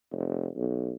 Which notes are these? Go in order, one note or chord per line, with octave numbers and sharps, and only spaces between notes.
F1
B1